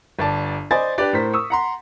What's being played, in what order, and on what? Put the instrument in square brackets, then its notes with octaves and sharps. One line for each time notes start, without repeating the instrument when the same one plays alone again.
[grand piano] G1 D5 A5
C5 D5 D#5 G#5 B5 A6
D4 G4 B4 D5
A2 A#4 C5 B6
C#6 D#6 E6
F#5 A#5 C6